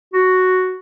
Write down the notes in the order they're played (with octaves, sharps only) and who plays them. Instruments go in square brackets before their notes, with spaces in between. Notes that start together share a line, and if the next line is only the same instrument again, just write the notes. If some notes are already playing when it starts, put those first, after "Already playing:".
[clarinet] F#4